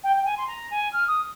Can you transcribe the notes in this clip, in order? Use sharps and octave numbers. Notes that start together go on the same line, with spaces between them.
G5
G5
G#5
C6
A#5
G#5
F6
D#6